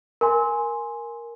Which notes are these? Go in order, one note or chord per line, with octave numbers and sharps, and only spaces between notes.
A#4 G#5 C6